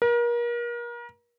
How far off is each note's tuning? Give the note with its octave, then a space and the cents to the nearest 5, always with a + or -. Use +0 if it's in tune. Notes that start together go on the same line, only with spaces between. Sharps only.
A#4 +35